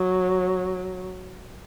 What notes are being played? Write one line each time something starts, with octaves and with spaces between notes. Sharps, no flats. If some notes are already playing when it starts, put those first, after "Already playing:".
Already playing: F#3